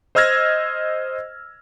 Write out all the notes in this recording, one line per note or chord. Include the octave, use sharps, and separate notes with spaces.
C5 D#5 E6 F6 G#6 A#6